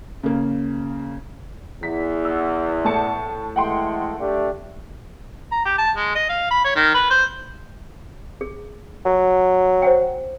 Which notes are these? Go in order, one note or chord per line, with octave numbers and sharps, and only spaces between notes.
C#3 A#3
E2 B6
E6
A2 A5 C#7
E3 G#3 A3 F#5 G5 C6
A3 D4 G4
A#5
G4
A5
G#3
D#5
F5
B5
C#5
D#3
B4
C5
G#4
F#3
C5 F#5 G5